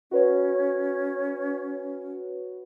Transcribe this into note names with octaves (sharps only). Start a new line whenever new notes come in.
C#4 F#4 B4 C#5